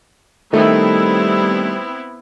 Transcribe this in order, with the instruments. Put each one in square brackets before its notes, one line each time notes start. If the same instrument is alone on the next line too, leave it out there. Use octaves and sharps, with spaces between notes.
[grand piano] D#3 A3 [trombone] G3 [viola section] B3 C4 E4